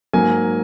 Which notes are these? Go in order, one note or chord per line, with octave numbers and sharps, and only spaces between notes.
G#2 F#3 A#3 G#5